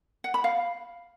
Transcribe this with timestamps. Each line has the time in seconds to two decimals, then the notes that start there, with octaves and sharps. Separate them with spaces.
0.24 F#5
0.34 B5
0.44 F5